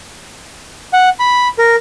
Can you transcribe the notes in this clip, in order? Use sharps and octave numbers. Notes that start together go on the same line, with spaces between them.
F#5
B5
A#4